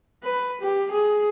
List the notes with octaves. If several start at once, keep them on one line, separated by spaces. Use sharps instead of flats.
B4
G4
G#4